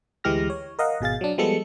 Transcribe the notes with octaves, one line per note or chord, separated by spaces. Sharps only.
D2 E3 G#3 G4 F6 A#6
C#5
A#4 D#5 F5 F#5
G#1 B2 G#4 F5 A6
F#3 D4
F3 G3 G#3 B3 A4 C#7